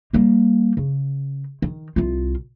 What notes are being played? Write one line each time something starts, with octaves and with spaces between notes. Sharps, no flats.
G3 A#3
C#3
D#3
C2 F4